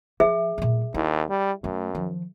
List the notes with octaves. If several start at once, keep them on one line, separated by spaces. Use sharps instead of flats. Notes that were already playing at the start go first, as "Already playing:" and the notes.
F3 G#4 E5
A#2 G3
D#2 E4
G3
F#2 A3
D#3 F3